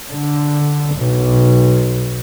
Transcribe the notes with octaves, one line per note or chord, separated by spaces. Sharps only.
D3
B1